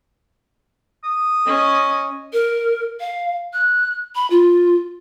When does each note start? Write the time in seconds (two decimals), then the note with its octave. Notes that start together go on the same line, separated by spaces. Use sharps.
1.04 D#6
1.47 C#4 D#5
2.33 A#4
3.00 F5
3.53 F#6
4.15 B5
4.30 F4